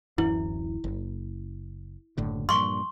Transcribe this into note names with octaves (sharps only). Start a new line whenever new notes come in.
D1 F#2 E3 E4
F#1
F#1 A2 D3
G2 A#2 C6 C#6